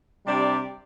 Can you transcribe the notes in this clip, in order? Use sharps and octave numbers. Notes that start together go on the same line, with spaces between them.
C3 G3 D4 G4 D5